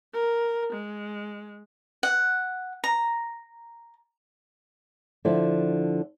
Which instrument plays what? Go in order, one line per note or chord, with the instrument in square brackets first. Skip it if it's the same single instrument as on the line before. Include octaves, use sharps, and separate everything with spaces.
[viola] A#4
G#3
[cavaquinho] F#5
A#5
[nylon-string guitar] D3 F3 E4